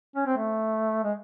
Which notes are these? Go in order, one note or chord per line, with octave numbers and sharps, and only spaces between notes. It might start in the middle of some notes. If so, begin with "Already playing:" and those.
C#4
C4
A3
G#3